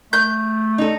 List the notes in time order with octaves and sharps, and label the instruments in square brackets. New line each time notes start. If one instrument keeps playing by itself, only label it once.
[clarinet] A3 [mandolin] G6
[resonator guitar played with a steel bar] D#4 A4